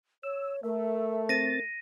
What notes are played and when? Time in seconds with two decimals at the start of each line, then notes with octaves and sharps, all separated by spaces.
0.23 C#5 E6
0.63 A3 A#4 E5
1.29 C4 A6 A#6 D#7